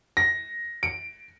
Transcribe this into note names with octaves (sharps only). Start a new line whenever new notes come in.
A#6
D7